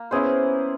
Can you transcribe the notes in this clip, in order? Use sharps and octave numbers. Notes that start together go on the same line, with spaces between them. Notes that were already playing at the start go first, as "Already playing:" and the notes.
Already playing: A#3
B3 C#4 E4 G#4 C5